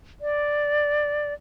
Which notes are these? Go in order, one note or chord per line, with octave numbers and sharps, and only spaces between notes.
D5